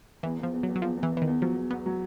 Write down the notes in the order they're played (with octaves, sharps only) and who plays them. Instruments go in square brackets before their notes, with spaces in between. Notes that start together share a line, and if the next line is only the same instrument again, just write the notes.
[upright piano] E2 [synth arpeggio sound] E3
[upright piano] E2 [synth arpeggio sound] F3
[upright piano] E2
[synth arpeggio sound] F#3
[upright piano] E2
[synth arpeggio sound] F#3
[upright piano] E2 [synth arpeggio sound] F3
[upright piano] E2
[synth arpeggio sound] E3
[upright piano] E2
[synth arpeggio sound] E3
D#3
[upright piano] E2
[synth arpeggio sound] F3 [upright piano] F#3
[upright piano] E2
[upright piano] E2 [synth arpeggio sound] B3
[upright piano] F#3